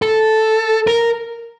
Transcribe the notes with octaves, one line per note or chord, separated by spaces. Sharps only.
A4
A#4